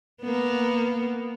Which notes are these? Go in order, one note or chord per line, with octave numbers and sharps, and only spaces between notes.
A#3 B3